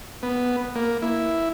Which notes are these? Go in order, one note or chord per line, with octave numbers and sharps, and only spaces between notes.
B3
A#3
E4